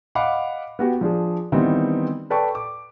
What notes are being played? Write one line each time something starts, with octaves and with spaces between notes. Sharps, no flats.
D#5 F5 F#5 B5 D6
B3 F#4 G4
F3 D4 G#4
D#3 E3 G3 B3 C4 D#4
A4 B4 D5 G5 A5 C#6
D6